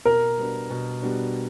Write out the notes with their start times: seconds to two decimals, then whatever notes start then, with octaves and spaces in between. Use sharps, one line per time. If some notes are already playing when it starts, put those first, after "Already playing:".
0.05 B2 A#4
0.38 G3 B3 D4 F#4
0.70 B2
1.02 G3 B3 D4 F#4